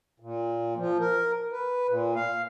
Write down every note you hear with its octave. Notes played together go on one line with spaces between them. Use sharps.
A#2
F3
A#4
B4
A#2
F5